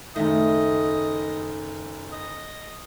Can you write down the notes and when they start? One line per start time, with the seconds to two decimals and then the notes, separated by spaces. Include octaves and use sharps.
0.16 F#1 D#3 A3 D#5
2.13 D#5